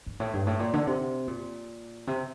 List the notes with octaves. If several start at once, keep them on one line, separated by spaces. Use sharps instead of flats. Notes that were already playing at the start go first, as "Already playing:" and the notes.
G2
A2
G2
A2
A#2
D3
C3
A#2
C3